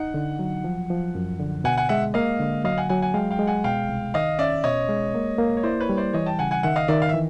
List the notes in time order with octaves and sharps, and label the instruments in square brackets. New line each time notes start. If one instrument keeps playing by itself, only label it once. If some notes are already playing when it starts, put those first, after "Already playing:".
Already playing: [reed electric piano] D#4 [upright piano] F#5
[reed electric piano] D3
F#3
F3
F3
F#2
D3
[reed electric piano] B2 [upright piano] F#5 G#5
[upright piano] F#5 G#5
[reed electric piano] G#3 [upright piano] E5 F#5
[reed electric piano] A#3 [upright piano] D#5 F5
[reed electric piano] D3
[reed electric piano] F#3 [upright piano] D#5 F5
[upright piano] F#5 G#5
[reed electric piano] F#3 [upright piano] F#5 G#5
[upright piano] F#5 G#5
[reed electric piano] G#3 [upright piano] F5 G5
[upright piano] F5 G5
[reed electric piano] G#3
[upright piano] F#5 G#5
[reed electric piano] B2 [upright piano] F5 G5
[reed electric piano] C2
[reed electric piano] D#3 [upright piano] D#5 F5
[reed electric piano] C#4 [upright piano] D5 E5
[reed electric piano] B2 [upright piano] C#5 D#5
[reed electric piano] G#3
A#3
A#3
[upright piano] C#5
[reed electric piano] E4 [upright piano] C5 D5
[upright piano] B4 C#5
[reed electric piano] G3
[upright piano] C5 D5
[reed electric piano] E3 [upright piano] C#5 D#5
[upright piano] G5 A5
[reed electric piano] C#3 [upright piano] F#5 G#5
[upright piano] F#5 G#5
[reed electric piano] D#3 [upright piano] E5 F#5
[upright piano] D#5 F5
[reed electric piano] D#3 [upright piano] D5 E5
[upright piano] F5
E5
[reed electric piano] E3